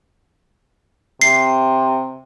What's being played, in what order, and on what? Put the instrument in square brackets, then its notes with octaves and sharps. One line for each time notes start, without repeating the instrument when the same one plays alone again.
[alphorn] C3 [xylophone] C7